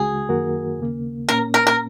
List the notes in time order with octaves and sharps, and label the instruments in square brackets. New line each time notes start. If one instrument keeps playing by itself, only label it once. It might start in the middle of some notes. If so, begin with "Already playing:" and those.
Already playing: [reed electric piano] C#2 C#3 G#3 F#4 [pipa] G#4
[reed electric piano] F#2 D#3 A#3 F#4 A#4
D#2 C#3 A#3
[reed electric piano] A#2 A#3 C#4 [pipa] A#4
[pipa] A#4
A#4